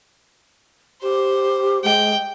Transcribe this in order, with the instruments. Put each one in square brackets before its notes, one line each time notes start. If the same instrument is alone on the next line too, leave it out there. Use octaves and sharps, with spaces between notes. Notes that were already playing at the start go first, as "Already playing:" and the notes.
[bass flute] G4 [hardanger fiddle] C5
[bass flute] G#3 [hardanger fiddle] G5